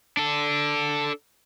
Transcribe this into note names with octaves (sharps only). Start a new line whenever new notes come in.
D4 A4